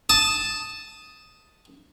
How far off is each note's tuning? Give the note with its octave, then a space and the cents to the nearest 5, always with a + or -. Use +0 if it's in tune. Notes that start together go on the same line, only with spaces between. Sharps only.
A5 +0 D#6 +5